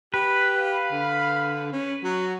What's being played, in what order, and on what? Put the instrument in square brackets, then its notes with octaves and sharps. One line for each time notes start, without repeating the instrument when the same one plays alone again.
[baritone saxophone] G4 [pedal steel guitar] B4
[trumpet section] F5 B5
[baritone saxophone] D3
C#4
[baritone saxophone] F#3 [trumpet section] F#4